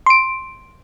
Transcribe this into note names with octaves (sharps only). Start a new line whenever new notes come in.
C6 D7